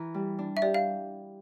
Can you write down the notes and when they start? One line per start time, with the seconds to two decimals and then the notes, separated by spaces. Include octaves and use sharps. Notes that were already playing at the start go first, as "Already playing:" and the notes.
Already playing: E3 E4 A#4
0.14 G3
0.39 D4
0.57 E5
0.62 G4 D5
0.74 F5